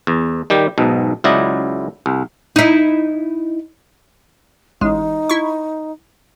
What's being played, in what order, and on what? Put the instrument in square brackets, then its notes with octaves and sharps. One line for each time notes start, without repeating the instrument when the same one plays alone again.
[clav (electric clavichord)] E2
D#3 G3 G4
B1 G#2 B2
C#2 F#3 E4 D5 D#5
C2
[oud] D#4 E4
[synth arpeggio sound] A1 G#3 [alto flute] D#4
[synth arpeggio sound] E4 C#6